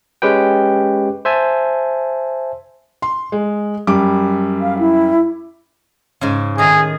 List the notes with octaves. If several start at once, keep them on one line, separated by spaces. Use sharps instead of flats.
G#3 C#4 G4 B4 G5
C5 E5 G#5 A5
C6
G#3
F#2 G3 D6
F5
E4
G#2 C#3
A2 D#3 G#4 A#5